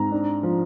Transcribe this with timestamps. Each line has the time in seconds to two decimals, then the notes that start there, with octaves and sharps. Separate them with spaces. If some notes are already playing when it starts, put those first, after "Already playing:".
Already playing: G#2 C4 A#5
0.12 D4
0.43 F3